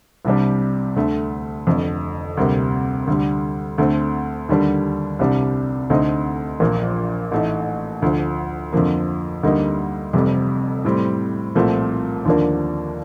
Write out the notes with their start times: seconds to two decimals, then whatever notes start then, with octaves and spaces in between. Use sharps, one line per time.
0.25 C2 C3 G3 D4
0.96 D2 D3 A3
1.67 F1 F2 D3
2.37 D2 C3 G3 A#3
3.07 D2 D3 G3
3.78 D2 D3 A3 C4
4.49 D#2 D3 G3 D4
5.19 C2 C3 G3 D4
5.90 D2 D3 A3 C4 D#4
6.60 A#1 A#2 F3 A#3
7.32 A1 A2 A3 D#4
8.02 D2 D3 F3
8.73 F2 D3 F3 A#3
9.43 D2 D3 G3 A#3 D#4
10.13 F1 F2 C3 G3
10.85 A2 G3 C4
11.55 C2 A#2 F3 A3 C4
12.25 D#2 D3 F3 A#3 D4